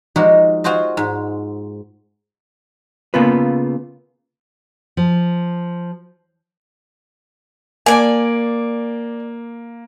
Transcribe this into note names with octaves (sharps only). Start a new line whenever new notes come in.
F3 G#3 D#4 F#4 G4
F4 F#4 G#4 C5 D#5
G#2
C#3 A#3 B3 F4 B4
F3
A#3 D5 G#5